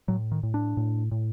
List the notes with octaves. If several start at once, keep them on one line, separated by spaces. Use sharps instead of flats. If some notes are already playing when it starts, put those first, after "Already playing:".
A2 F#3
D#3
A2
D4
A2
A2